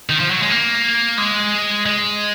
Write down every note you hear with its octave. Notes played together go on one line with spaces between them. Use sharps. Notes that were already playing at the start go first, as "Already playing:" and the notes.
D#3
F3
F#3
G#3
A#3
G#3
G#3